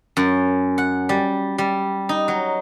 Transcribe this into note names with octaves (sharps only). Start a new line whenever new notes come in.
F#2
F#5
G3
G3
D#4
F#3